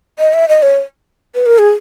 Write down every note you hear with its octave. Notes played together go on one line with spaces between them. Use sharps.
D#5
E5
D#5
C#5
B4
A#4
G#4